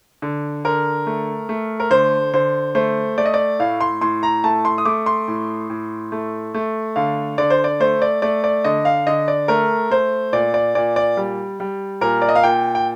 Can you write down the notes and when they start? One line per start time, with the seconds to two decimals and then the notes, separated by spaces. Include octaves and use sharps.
0.22 D3
0.64 D3 A#4
1.07 A3
1.49 A3
1.80 A#4
1.90 D3 C5
2.33 D3 C5
2.75 A3 C5
3.18 A3 D5
3.26 D#5
3.34 D5
3.59 A2 F5
3.81 C6
4.01 A2 C6
4.23 A#5
4.44 A3 A5
4.65 C6
4.78 D#6
4.85 A3 D6
5.06 C6
5.28 A2
5.70 A2
6.12 A3
6.54 A3
6.96 D3 F5
7.38 D3 D5
7.50 C5
7.64 D5
7.80 A3 C5
8.02 D5
8.22 A3 D5
8.44 D5
8.64 D3 D#5
8.85 F5
9.07 D3 D#5
9.28 D5
9.48 A3 A#4
9.90 A3 C5
10.33 A#2 D5
10.54 D5
10.75 A#2 D5
10.96 D5
11.17 G3
11.60 G3
12.01 A#2 A#4
12.22 D5
12.29 D#5
12.35 F5
12.43 A#2 G5
12.75 G5